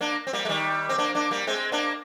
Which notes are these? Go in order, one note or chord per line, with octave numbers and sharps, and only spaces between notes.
A#3 D4
C4
G3 A#3
G#3
D#3 G3
C4
A#3 D4
A#3 D4
G3 A#3
G#3 C4
A#3 D4